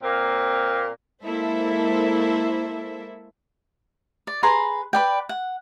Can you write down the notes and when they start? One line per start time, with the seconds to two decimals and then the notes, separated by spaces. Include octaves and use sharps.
0.03 A#2 A#3 C4
1.24 G#3 A#3 E4 A4 C5 E5
4.27 D5
4.43 G#4 B4 A#5 C6
4.93 B4 D5 G5
5.29 F#5